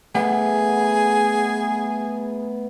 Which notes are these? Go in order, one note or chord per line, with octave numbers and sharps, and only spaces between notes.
A3 B3 G#4 F#5